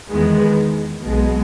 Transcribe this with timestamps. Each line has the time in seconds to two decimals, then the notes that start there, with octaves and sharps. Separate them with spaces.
0.09 E2 D#3 G#3 B3
1.06 B1 B2 G#3